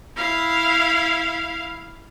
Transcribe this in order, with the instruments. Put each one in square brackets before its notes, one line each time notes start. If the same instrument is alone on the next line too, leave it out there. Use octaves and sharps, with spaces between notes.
[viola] E4 F5